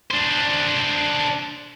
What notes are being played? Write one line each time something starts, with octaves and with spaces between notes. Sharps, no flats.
D4 C5